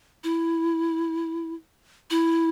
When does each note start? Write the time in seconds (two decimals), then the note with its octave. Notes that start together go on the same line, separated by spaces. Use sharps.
0.24 E4
2.10 E4